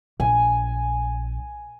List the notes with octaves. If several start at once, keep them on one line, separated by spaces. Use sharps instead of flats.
A#1 G#5